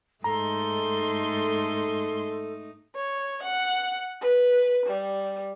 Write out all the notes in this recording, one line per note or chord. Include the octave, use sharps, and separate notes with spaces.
G#2 A3 D#4 A4 A#5 C6
C#5
F#5
B4
G3